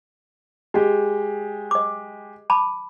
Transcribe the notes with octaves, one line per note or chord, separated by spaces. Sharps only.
G#3 G4
D#5 D6
A5 B5 D6